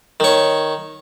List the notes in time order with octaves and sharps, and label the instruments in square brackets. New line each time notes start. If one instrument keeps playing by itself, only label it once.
[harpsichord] D#3 C#5